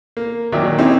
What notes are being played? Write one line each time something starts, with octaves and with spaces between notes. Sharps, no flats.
A#3
A#2 D#3 F#3 D5 E5
C4 C#4 D#4 E4 G4